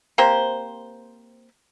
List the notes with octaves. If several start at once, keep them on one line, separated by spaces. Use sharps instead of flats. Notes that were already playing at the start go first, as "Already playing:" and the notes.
A#3 C4 G4 C5